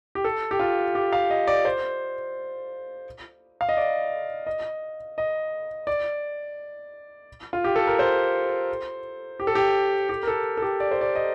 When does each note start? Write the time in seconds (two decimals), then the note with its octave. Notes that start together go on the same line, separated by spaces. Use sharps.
0.15 G4
0.24 A4
0.51 G4
0.60 F4
0.95 G4
1.13 F5
1.30 D#5
1.47 D5
1.65 C5
3.61 F5
3.69 D#5
3.77 D5
4.47 D#5
5.18 D#5
5.87 D5
7.53 F4
7.64 G4
7.76 A4
7.87 A#4
7.99 C5
9.40 G4
9.47 A4
9.55 G4
10.09 G4
10.23 A#4
10.28 A4
10.57 A4
10.62 G4
10.80 D5
10.91 C5
11.01 D5
11.15 D#5